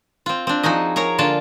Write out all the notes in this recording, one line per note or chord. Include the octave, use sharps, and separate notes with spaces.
C4 F4
C4 D4
F3 D#4 F#4 G#4 D#5
G#4 A#4 C#5 A#5
D3 A#3 F4 A5